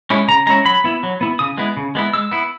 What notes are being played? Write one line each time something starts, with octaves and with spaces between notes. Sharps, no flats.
G#3 C#4 E4
C#3 A#5
G#3 C#4 E4 A#5
F#3 B5
B3 E4
F#3
B3 E4
C#3 D#6
G#3 B3 E4
C#3
G#3 B3 E4
G#3 E6
B3 E4